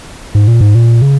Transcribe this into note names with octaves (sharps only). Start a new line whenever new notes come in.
G#2
A#2
G#2
A#2
C#3